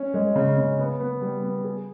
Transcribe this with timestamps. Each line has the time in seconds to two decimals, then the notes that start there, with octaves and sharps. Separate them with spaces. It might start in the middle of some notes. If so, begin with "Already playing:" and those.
Already playing: C#4
0.14 G#3
0.35 C#3
0.58 C#3
0.79 B3
1.00 B3
1.21 G3
1.43 B3
1.64 G#4